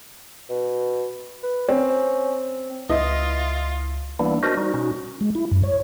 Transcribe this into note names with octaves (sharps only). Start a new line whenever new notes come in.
B2
B4
C4 C#4
C#2 E4 F4 D#5
E3 G3 A#3 B3 D4 E4
D4 F#4 A#4 C5 D#5
G3 D#4 F#4
B2 C#4 D#4 F#4
G#3
E4
F#2
C#5